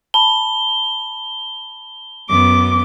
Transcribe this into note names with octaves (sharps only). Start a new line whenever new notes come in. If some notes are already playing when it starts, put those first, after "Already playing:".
A5 B5 G7
F#2 B3 D6